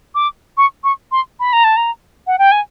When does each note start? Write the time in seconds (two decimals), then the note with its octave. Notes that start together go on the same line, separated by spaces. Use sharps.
0.15 D6
0.57 C#6
0.84 C#6
1.12 C6
1.40 B5
1.53 A#5
1.64 A5
1.77 A#5
2.27 F#5
2.39 G5
2.52 G#5